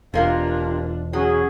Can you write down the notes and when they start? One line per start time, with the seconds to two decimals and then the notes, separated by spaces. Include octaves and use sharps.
0.14 E1 C3 A#3 D4 F4 A#4
1.13 F#3 C#4 F#4 G#4